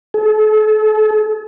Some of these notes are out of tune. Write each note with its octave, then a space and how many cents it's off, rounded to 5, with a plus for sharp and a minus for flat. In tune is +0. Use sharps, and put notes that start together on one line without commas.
A4 -40